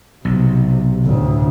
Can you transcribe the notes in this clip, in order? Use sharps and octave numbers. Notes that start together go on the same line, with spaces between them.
B1 C3
D2 A2